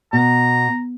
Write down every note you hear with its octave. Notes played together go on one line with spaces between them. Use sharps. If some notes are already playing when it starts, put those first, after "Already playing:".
B2 A#5